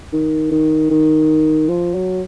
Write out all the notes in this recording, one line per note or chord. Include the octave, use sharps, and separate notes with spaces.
D#3
D#3
D#3
F3
F#3